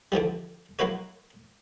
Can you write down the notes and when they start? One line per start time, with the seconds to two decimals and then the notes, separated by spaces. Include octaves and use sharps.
0.12 D3 E3 F3 G3
0.79 F#3 A#3 E4 B4 C#5